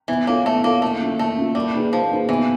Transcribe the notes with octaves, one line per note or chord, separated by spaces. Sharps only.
E3 B3
A#3 E4 A4 C#5
A3 B3
A#3 E4 A4 C#5
A3 A#3
C#4 E4
A3 A#3
C#4 E4
G3 A#3
D#4 G#4 B4
F3 A#3
D#4 G#4 B4
B2 E3